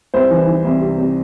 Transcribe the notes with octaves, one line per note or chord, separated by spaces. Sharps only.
C2 C5
E3
E3
C2
C3
C3